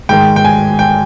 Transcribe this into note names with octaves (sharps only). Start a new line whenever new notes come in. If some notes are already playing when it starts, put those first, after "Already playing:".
G#2 D#3 G#3 G5
G5
G#5
G5